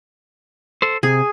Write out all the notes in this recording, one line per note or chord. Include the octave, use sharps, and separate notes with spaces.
A4 C5
C3 G#4